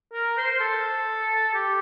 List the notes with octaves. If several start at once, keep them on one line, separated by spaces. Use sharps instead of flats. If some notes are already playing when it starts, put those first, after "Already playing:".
A#4
C5
A4
G4